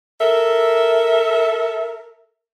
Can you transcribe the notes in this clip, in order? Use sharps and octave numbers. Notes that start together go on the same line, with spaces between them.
A4 A#4 E5